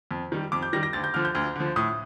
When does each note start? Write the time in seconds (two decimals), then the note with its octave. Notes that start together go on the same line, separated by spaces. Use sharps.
0.11 F2
0.32 D#3 G3
0.52 F2 D6
0.63 G6
0.73 D#3 G3 A#6
0.83 A#6
0.93 D2 A6
1.04 G6
1.14 D3 F3 F6
1.25 G6
1.35 D2 F6
1.56 D3 F3
1.76 A2 D#6